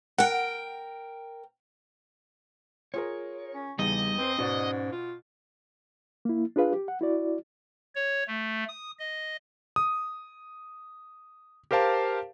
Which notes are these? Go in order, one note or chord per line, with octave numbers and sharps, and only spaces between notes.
A#4 F#5 G5
F4 G#4 A#4 C#5
C#4
E2 C#3 G3 B3 D#4 D#5
C4 B4 C5
G#2 B2 C#4 F#4 D5
F4
A#3 E4
D4 F4 G#4 B4 F5
G4
F#5
E4 F#4 D5
C#5
A3
D#6
D#5
D#6
G4 A#4 C5 F5 A5